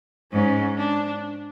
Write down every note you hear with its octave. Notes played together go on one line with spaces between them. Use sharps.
G#2 C#4
D4